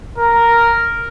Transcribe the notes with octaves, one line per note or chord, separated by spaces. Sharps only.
A#4